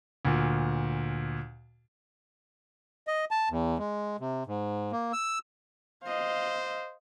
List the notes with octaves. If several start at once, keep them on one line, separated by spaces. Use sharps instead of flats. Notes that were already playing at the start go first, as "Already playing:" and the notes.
D2 A#2
D#5
A5
E2
G#3
C3
G#2
A#3
E6
C5 D#5 F5